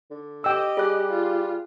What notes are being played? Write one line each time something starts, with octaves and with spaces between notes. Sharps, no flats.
D3
G4 D#5 G5 E6
G3 G#4 F#6
F4